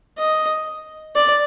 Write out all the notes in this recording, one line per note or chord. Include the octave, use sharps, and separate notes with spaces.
D#5
D5